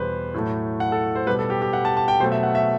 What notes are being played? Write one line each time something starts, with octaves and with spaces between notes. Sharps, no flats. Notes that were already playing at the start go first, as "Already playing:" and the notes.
Already playing: E2 B2 G3 B4 C5
A2 F#3 A3
F#5
A4
C5
B2 G3 B4
A4
G4
G4
F#5
A5
A5
G5
B2 F#3 A3 C5
E5
F#5
E5